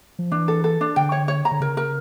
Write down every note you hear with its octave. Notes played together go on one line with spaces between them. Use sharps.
F3
E3 D4
A4
A4
D4
D3 G5
C#5
C#5
A#5
D3
C#3 A#4
A#4